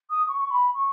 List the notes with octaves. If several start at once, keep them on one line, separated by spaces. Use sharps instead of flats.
D#6
C#6
C#6
B5
C#6